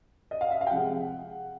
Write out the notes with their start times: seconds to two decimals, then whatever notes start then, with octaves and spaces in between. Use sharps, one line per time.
0.31 D#5
0.41 F5
0.51 E5
0.61 F5
0.67 G5
0.71 C3 F3 G#3 C4 F#5